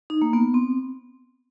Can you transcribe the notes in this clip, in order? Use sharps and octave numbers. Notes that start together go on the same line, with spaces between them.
D#4
A#3
B3
C4